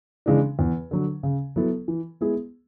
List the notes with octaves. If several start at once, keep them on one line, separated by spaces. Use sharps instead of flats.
C#3 E3 G#3 D4
E2
D3 F#3
C#3
F#3 B3 E4 A4
E3
G#3 B3 E4 G#4